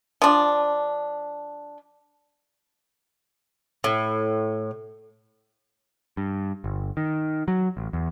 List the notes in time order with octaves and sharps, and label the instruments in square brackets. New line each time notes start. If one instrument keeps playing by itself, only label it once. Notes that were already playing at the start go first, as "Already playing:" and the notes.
[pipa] F3 D4
[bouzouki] A2
[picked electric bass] G2
G1
D#3
F#3
A1
E2